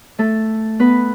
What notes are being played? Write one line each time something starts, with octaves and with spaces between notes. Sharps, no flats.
A3 A4
B3 B4